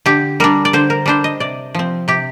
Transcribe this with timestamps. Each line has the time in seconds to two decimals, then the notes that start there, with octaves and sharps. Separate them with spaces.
0.06 D3 G4
0.40 G3 D4 A#4
0.65 D5
0.73 D3 C5
0.90 A#4
1.06 G3 D4 C5
1.24 D#5
1.40 C3 D5
1.75 F3 C4
2.08 C3 G4